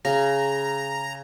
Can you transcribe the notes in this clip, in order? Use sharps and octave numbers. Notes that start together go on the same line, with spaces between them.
C#3 A#5